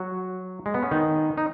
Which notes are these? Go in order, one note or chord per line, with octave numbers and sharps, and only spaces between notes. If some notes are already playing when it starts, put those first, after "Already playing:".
Already playing: F#3 F#4
G#3
B3
C#4
D#3 D#4
D#4